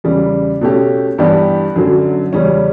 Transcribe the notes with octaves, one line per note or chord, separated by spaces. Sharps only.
E2 C#3 G3
B2 A3 C#4 G4
G2 E3 B3 D4 G4
F#2 D3 F#3
E2 C#3 G3 C#4